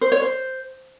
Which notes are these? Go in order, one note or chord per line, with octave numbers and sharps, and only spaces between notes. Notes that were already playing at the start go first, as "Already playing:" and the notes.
C5
C#5
C5